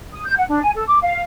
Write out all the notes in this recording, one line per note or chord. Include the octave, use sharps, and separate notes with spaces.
D#6
G6
F#5
D4
G#5
A4
D6
F5